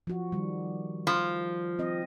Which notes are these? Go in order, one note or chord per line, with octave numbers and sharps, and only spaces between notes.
F3 F#4
D#3 G3
F3
C4 D#5